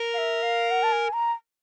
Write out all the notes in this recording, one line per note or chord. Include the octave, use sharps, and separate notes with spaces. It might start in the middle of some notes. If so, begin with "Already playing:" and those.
Already playing: A#4
F5
E5
F5
F#5
A5
G#5
A#5